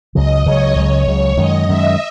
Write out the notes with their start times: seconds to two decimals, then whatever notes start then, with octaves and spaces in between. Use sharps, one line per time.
0.14 C#2 C#3 F#3 D#5
0.45 C#2 C#3 F#3 C#5
0.76 C#2 C#3 F#3 C#5
1.06 C#2 C#3 F#3 C#5
1.37 F#2 D#3 G#3 D#5
1.68 F#2 D#3 G#3 E5